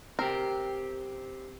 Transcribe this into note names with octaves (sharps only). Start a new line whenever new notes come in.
C4 G4 A#4